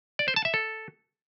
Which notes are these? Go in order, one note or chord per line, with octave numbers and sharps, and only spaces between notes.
D5
C5
A5
E5
A4